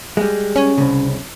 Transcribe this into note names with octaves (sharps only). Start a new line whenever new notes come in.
G3 G#3
C#4
C2 C#3